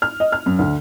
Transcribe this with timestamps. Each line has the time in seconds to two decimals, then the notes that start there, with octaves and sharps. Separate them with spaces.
0.02 F6
0.20 D#5
0.32 F6
0.46 F#2
0.59 D2